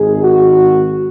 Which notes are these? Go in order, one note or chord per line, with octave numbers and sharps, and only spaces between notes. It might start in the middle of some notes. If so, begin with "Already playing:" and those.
Already playing: G#1 G#2 D#3 G#4
F#4